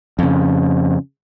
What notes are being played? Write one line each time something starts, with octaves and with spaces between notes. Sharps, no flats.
F2 C#3